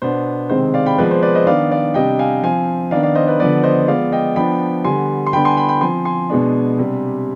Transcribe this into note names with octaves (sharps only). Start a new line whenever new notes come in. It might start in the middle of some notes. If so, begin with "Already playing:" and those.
B2 B3 D4 C5
C3 D#3 G#3 C4 C5
D5 F5
G5 B5
F3 G#3 B3 B4 D5
C5
B4 D5
C5 D#5
D#3 B3 D4 D5 F5
D5 F5
C3 G3 D4 D#5 G5
F5 G#5
F3 C4 F5 G#5
D#3 B3 D4 D5 F5
D5 F5
C5 D#5
B4 D5
D3 F3 B3 B4 D5
C5 D#5
F3 G#3 B3 D5 F5
D#5 G5
F3 B3 D4 G5 B5
D3 G3 B3 G#5 C6
C6
D3 G3 B3 D4 G5 B5
G#5 C6
G5 B5
G5 B5
F3 C4 G#5 C6
G#5 C6
B2 G#3 B3 D4
C3 G3 D4